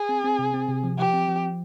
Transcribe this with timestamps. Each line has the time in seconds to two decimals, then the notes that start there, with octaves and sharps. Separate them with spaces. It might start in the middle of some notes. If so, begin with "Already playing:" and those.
Already playing: G#4
0.09 C4
0.24 C4
0.39 C3
0.54 C4
0.69 C3
0.84 F3
0.99 F3 G4
1.13 C4
1.28 F3